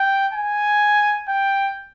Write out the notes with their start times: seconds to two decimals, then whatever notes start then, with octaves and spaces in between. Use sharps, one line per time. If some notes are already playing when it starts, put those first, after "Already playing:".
Already playing: G5
0.33 G#5
1.29 G5